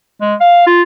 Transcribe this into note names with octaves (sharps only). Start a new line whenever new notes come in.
G#3
F5
F4